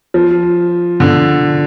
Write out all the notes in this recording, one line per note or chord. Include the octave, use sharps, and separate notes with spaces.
F3
D3